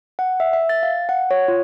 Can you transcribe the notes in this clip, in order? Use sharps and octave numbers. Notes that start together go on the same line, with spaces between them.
F#5
E5
E5
A6
F5
F#5
C#5
F4